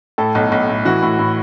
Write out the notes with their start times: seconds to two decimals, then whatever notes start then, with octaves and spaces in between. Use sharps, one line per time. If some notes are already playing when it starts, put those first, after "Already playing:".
0.18 A2 A4
0.35 B1
0.52 B1
0.69 A2
0.85 E3 F#4
1.02 A2
1.19 A2